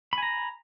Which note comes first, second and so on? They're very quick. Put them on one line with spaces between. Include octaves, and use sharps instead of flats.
B5 G#5 A#5